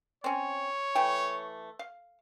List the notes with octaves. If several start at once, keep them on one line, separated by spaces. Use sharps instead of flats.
C4 C#4 C#5
E3 A3 G5
F5